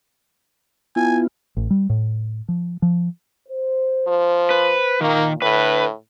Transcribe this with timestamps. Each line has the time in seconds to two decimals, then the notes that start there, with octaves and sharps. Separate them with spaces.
0.96 B3 E4 F4 G#5
1.57 A1
1.70 G3
1.90 A2
2.48 F3
2.82 F3
3.49 C5
4.07 F3
4.50 B4
5.01 A#2 D#3 A#3
5.42 A2 D3 B4